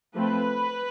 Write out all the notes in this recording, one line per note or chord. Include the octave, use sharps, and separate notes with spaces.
F3 A3 C4 B4